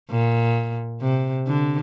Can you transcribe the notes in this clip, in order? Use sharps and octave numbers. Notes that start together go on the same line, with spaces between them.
A#2
C3
D3